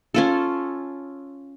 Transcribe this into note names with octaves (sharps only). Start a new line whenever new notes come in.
C#4 F4 A4